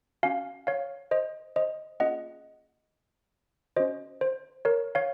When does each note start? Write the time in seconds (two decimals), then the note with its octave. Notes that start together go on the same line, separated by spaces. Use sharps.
0.23 C#4 F#4 F5 G#5
0.67 C#5 F5
1.11 C5 D#5
1.56 C5 D#5
2.00 A#3 C#4 F4 G#4 D#5 F#5
3.76 C#4 F#4 C5 D#5
4.21 C5
4.65 A#4 C#5
4.95 C#5 F5